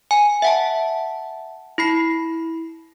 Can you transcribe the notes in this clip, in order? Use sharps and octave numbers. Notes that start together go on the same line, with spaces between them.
G#5
E5 F#5 A5
E4 B5 C7